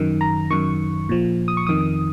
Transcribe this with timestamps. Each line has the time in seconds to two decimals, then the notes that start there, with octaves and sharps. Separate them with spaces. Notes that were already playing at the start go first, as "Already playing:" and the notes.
Already playing: F#2 D#3
0.21 A#5
0.50 F#2 D#3 C#6
1.09 A#2 F3
1.48 D#6
1.57 C#6
1.67 F2 D#3 D#6